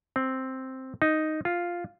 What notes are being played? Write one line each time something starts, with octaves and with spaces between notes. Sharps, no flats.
C4
D#4
F4